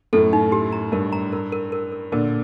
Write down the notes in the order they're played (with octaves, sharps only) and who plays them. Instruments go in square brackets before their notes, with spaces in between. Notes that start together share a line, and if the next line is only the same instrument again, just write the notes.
[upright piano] F#2 A2 [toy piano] A4
[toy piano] D#4
G4
A#5
[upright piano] G2 [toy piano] A#4
[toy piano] A#5
A#4
A#4
A#4
A#4
[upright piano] A#2 D3 [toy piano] A#4